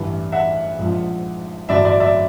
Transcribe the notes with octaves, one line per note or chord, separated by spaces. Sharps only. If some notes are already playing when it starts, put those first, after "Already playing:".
Already playing: A1 G2 E3 G3
E5 F#5
A#1 G#2 F3
A1 G2 D3 F#3 D5 E5
D5 E5
D5 E5